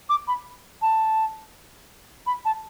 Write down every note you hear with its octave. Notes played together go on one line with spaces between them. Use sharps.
D6
B5
A5
B5
A5